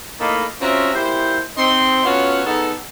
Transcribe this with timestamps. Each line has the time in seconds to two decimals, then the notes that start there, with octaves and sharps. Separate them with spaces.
0.21 A2 A#3 D#4 A4 D#5 B5
0.61 C4 C#4 F4 F#4 E5 A#5
0.94 A#2 E4 G4 C5
1.57 C4 D#4 C6
2.05 B3 C#4 F4 F#4 A4 C#5
2.46 B3 D#4 G#4 A4